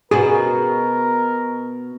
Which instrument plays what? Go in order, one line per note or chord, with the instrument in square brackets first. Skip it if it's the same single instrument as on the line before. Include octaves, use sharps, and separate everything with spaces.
[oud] B2 B3 F#4 [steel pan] G#4 [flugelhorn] A#4